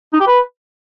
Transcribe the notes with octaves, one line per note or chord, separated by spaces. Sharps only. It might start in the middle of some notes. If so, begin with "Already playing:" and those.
D#4
G4
B4